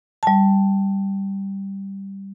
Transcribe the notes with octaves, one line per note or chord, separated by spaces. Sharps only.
G3 A5